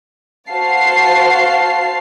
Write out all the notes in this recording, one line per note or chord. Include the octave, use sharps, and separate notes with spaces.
F#4 C5 F5 A5 C7